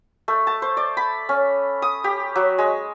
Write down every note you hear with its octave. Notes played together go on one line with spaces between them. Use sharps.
A3
A5
C5
D5
B5
C#4
D#6
G4
F#3
G#3